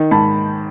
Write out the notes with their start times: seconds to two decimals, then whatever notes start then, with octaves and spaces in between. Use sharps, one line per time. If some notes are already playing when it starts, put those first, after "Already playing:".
Already playing: D#3
0.11 G#2 A5 B5